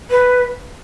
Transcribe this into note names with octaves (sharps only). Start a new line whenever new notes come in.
B4